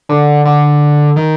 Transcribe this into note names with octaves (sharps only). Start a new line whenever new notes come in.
D3
D3
D#3